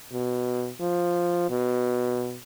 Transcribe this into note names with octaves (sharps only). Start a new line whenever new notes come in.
B2
F3
B2